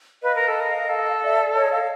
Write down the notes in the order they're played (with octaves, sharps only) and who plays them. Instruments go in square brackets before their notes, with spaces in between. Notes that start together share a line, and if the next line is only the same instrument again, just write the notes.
[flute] B4 [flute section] D#5 F5
[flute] A#4
A4
A#4
A4
[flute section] D5 E5
C#5 D#5
D#5 F5